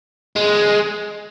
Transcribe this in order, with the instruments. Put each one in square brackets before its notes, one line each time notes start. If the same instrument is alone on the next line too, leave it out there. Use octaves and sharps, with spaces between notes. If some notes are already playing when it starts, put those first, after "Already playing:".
[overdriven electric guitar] G#3